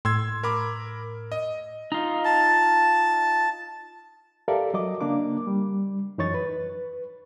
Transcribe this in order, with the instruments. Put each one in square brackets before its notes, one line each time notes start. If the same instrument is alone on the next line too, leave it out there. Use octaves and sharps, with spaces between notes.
[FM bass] A2 [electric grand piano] C6 E6 G#6
[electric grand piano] A#4 B5 D6
D#5
[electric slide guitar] D#4 F4
[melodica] A5
[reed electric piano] G4 A4 A#4 D5 E5 F5
F#3 D#5 D6
C#3 A#3 D4 D6
G3
F#2 E3 D#4 C#5 C#6 A6
B4